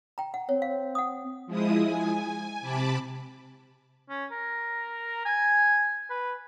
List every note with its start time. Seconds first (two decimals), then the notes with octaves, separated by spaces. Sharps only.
0.18 G5 A#5
0.34 F#5
0.49 C4 C#5
0.62 F5
0.95 F#5 D#6
1.47 F3 G#3 E4 D#6
1.83 G#5
2.61 C3 A5 B5 D6
4.09 C#4
4.31 A#4
5.25 G#5
6.10 B4